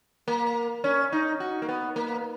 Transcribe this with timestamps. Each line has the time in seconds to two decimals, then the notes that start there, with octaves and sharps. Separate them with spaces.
0.28 A#3
0.84 C#4
1.12 D#4
1.40 F#4
1.62 A#3
1.68 B3
1.96 A#3